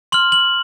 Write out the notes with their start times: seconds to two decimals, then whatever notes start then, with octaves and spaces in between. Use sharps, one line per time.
0.12 C6 F6 F#7
0.32 F#7